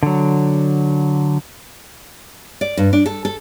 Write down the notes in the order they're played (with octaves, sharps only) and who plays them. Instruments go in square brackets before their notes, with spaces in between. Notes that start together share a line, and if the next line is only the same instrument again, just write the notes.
[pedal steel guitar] D3 F#3
[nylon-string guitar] D5
G2
D4
A4
A4